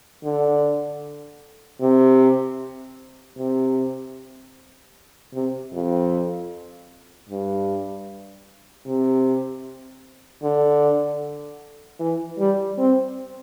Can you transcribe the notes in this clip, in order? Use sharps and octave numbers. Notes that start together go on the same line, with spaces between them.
D3
C3
C3
C3
F2
G2
C3
D3
E3
G3
C4